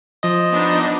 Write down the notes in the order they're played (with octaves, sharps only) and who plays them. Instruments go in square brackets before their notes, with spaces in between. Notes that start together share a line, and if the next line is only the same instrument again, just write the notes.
[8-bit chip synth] F3 D#5
[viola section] B3 D4 D#4